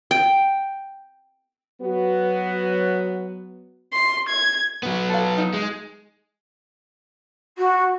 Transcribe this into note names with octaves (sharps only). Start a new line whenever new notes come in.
G5
F#3 B3 F#4
C6
G#6
F#3 B3
A4 F5
D#4
G#3
F#4